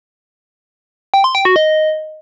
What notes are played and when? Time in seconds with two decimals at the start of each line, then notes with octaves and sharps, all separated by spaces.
1.14 G5
1.24 C6
1.35 G5
1.45 F#4
1.56 D#5